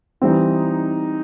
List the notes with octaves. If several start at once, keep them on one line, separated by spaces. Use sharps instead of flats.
E3 G3 C4 D#4